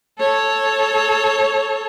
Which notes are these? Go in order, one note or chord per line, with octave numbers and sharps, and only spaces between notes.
A4 C#5